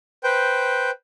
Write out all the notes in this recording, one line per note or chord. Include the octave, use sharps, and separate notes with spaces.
B4 C5 G5